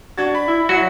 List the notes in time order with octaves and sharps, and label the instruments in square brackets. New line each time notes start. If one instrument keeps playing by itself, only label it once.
[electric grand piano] D4 G#6 A6 [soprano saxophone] F#4
[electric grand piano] D5 [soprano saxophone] B5
[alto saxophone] E4
[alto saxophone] F#3 [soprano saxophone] E4 [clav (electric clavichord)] F#4